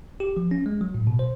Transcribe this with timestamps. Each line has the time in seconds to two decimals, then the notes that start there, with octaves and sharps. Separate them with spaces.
0.20 G4
0.37 F3
0.51 C#4
0.66 G#3
0.81 F#3
0.94 A2
1.07 B2
1.19 C5